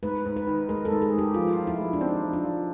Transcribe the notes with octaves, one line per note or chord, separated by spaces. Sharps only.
G#2 B4
G#2
B4
D#3
G#3 A#4
A4
G#2
G#4
G#2
G4
F3 F4
F3
E4
G#3
D4
C4 D#4
F3
D4
F3